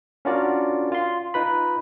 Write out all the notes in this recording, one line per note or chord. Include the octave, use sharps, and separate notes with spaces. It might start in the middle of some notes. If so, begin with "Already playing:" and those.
C#4 D4 F4 F#4 A#4 D5
F4 C6
D#4 F4 B4 B5